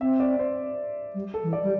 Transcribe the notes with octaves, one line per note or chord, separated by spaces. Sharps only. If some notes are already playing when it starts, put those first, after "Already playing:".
C4 E5
D5
C5
G3
A4
E3
D5
G3